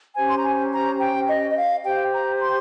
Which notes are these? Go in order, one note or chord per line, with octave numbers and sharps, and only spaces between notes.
C#4 G4 C5 G#5
C6
A#5
G#5
A#5
G5
D#5
D#5
F5
G4 C5 G5
A#5
C6